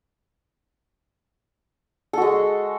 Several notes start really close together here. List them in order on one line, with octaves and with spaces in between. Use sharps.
A4 F#4 G#3